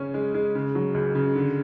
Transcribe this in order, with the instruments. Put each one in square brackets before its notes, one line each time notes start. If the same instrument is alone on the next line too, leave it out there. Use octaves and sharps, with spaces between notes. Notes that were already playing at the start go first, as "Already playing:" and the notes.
Already playing: [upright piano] C#3 C#4
G#3
G#3
C#3
F#3
C#2
C#3
D3